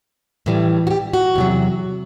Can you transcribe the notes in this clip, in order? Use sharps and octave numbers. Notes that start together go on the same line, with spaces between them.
A2 E3 G3
F#4
G4
F#4
E2 C3 F#3